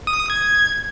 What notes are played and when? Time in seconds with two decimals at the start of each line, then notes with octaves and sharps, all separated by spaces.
0.07 D#6
0.30 G#6